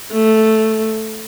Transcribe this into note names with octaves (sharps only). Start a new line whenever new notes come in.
A3